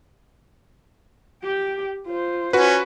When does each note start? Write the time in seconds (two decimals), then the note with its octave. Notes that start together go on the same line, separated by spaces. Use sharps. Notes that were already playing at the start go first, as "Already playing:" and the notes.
1.43 G4 G5
2.06 F4 C5
2.53 C#4 F#4 B4